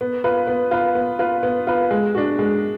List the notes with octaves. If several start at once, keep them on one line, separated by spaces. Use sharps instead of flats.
B3
F4 B4
B3
F4 B4
B3
F4 B4
B3
F4 B4
G#3
D4 F#4
G#3